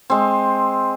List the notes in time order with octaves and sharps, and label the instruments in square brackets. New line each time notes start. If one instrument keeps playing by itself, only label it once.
[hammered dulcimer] G#3 C4